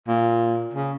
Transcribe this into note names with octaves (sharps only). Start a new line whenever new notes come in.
A#2
C#3